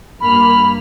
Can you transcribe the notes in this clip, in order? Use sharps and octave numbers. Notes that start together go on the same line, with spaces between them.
G2 A#3 B5 F6